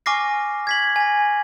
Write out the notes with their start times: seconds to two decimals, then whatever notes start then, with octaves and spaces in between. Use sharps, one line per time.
0.06 G#5 C#6 D6 F6 A#6 C7
0.67 G#6 B6 F#7
0.96 G#5 A#6